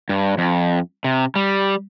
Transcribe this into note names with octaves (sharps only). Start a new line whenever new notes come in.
G2
F2
C3
G3